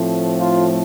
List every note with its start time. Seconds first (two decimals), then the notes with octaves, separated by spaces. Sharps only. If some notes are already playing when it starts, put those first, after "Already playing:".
Already playing: A2 F3 A3 C4
0.39 F4